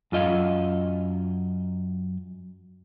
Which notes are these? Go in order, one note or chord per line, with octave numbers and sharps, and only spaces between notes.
F#2 F4 D#5 F5